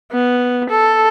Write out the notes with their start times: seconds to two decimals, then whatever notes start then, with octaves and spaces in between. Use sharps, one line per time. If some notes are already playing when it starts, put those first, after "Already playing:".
0.12 B3
0.70 A4